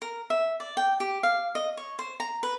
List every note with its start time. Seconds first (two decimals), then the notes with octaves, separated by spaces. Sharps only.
0.02 A#4
0.30 E5
0.60 D5
0.77 G5
1.00 G4
1.23 F5
1.55 D#5
1.77 C#5
1.99 C5
2.20 A#5
2.43 B4